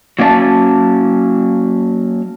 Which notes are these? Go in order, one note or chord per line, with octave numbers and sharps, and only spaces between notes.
F#3 A#3 C#4 D5 A5